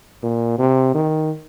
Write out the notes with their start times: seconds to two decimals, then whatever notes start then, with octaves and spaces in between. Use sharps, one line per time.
0.23 A#2
0.58 C3
0.94 D#3